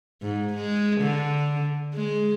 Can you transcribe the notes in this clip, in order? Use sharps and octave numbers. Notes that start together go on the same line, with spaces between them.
G#2
G#3
D3
G#3